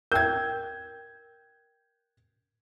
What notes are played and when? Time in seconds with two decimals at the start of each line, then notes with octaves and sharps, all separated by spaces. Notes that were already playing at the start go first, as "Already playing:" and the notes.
0.12 A#4 G5 G6 G#6